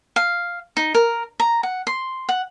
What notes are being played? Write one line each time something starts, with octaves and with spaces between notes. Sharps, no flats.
F5
D#4
A#4
A#5
F#5
C6
F#5